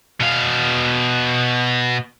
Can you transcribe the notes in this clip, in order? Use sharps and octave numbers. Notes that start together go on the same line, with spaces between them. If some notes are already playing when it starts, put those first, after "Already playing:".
B2 F5